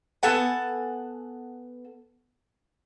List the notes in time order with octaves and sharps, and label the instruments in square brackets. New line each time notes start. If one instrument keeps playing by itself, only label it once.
[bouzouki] B3 A4 F#5 G#5